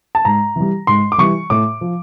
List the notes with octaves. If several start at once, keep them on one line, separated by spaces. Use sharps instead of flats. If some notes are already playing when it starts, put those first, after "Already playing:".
A5
G#2 A#5
E3 G3
G#2 C6
D6
E3 G3 C#6
A2 D6
F3